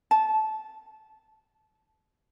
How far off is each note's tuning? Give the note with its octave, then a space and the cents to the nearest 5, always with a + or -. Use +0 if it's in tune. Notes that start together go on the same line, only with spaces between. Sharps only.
A5 -20